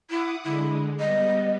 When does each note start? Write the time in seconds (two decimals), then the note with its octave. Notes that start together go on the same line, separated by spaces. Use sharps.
0.10 E4 F#5 D6 D#6
0.44 D3 G#3 E4
1.00 G3 B3 D#5